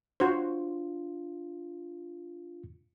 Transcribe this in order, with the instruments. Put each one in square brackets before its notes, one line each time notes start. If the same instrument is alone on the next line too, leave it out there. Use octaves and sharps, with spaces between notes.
[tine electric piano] D4 F4 [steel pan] F#4 C5